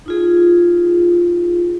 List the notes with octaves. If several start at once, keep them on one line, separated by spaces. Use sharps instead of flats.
D#4 F4 G#4